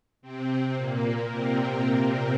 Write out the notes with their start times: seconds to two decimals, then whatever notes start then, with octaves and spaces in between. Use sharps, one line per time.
0.22 C3 C4
0.76 A#2 A#3
1.29 C3 C4